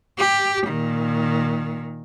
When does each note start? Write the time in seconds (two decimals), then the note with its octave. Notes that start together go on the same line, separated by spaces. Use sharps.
0.18 G4
0.67 A#2 D#3